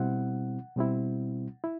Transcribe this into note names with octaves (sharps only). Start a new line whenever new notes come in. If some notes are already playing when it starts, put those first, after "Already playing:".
Already playing: B2 G3 C4 E4 F#5
B2 G3 C4 E4
E4